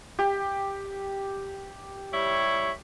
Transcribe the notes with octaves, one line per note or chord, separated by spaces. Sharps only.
G4
G3 E4 C#5